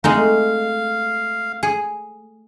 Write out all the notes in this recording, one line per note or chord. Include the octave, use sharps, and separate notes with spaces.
G#3 A3 C4 D#4 F5
G#4